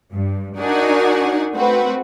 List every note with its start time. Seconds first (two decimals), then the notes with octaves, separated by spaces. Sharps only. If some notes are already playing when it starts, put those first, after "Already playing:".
0.12 G2
0.58 D4 D#4 F#4 A#4 F#5 G#5
1.53 A3 C4 F#4 B4